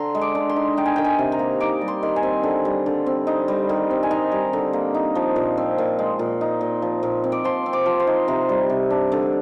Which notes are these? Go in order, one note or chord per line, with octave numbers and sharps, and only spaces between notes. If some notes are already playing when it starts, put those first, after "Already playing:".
Already playing: D3 A#5 C6
G#3
D6
D3
C6
D#4
D#4 G5
G#5
D#3 G5
G#5
C3
A#5
A#3
D#4 D6
G3
C6
D#3
G#5
C4
D3
G3
D3
C4
D#4
G3
D#3
C4
G#5
D#4 A#5
G3
D3
A#3
D#4
F3
A#2
C4
A#2
G#3
A#2
D#4
A#2
F3
A#2
C4
D6
F3 C6
C4
D6
F3
C6
D#4
C3 A#5
G3
C3
D4
D3